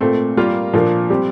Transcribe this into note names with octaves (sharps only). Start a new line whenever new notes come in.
A#2 A3 C4
G3 A#3 F4 A#4 F5
A#2 F3 A#3 D4
G3 C4 G4